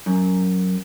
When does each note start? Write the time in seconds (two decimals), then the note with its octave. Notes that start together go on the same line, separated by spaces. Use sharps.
0.06 F#2